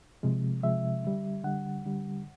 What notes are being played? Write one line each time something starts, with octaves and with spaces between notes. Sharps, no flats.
C3 F3 G#3
C3 F3 G#3 E5
D3 G3
D3 G3 F#5
D3 G3